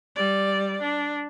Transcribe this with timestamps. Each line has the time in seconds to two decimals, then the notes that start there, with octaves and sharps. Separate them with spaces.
0.16 G3 D5
0.81 D4